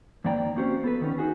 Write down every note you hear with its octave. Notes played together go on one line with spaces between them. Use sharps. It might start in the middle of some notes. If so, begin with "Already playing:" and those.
F2 D#3 A#3 D5 G5 A#5
A#3 C4 C#4 F#4 G4 C5
B3 A4 B4
D#2 D#3 B3 C#4
D#4 F#4 G#4